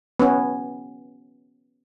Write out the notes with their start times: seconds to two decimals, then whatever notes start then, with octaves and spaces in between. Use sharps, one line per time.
0.20 B3 C#4